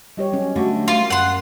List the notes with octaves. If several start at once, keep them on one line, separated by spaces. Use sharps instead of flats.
G3 G4 C#5 D#5
F#3 C#4
D3 A3 F#4
A#3 F4
F#2 F#5 C6